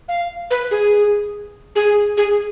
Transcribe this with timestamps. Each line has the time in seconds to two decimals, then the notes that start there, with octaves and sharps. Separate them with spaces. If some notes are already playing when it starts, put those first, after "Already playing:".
0.08 F5
0.51 B4
0.71 G#4
1.76 G#4
2.17 G#4